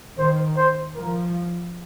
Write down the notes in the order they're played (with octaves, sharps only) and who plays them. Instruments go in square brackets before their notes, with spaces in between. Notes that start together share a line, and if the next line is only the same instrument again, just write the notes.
[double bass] D#3 [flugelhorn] C5
[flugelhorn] C5
[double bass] F3 [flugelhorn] A#4